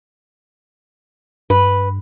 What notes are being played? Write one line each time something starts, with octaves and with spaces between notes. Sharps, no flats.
G2 B4